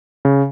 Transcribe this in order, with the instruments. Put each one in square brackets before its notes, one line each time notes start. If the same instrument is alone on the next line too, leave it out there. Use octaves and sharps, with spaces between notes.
[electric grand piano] C#3